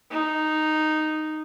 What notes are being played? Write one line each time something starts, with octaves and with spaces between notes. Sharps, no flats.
D#4